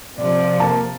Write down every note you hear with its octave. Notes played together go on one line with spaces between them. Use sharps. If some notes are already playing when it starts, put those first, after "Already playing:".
C3 F3 D5
A#3 A5